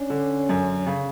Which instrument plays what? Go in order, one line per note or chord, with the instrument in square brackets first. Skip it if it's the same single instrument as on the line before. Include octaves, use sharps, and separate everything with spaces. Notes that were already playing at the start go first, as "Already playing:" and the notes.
Already playing: [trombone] C#4 [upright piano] D4
[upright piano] D3
F#2
C#3